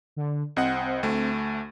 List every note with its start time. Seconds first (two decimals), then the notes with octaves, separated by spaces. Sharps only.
0.16 D3
0.56 C2 C4 D#5 F#5
1.03 D2 A3